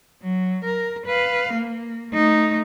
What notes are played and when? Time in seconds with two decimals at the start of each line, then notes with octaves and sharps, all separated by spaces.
0.22 F#3
0.65 A#4
1.06 B4 F5
1.54 A#3
2.12 A3 D#4